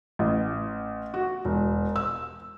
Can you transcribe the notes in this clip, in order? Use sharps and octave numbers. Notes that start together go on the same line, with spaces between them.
A1
F#4
E1
E6